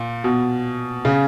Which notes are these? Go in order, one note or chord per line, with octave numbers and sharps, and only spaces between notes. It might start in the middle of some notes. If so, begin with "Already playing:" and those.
Already playing: A#2
B2
C#3